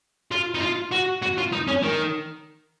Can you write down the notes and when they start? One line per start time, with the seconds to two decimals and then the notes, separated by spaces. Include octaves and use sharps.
0.31 F4
0.55 D#4
0.62 F4
0.92 F#4
1.22 F#4
1.38 F4
1.52 D#4
1.68 C#4
1.83 D#3